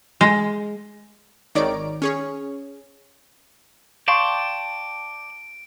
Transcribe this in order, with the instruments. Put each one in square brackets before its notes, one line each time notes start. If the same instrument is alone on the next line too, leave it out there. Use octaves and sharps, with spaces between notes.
[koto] G#3
[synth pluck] G#1 D#3 C#5 D5 A#5 D7
C#4 G#4 C#5
[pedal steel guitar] D5 G5 A5 [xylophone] F5 C6 C#6 [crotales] D7